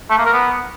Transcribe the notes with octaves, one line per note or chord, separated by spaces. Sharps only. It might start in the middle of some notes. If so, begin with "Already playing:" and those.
A3
A#3
A#4
B3